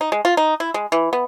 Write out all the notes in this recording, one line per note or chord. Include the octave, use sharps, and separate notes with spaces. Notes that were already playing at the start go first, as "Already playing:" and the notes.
D#4
G#3
F4
D#4
E4
G#3
E3
B3